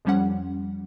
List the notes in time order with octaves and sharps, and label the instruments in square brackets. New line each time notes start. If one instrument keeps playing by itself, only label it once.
[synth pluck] F2 F3 G3 C#4 F#5